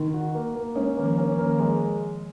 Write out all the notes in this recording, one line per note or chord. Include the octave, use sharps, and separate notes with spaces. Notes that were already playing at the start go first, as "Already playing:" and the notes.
Already playing: D#3 D#4
F#4
A#3
A#3
G#3 C#4
D#3 A#3
F3
C#4
F3
A#3
D#3
F3 G#3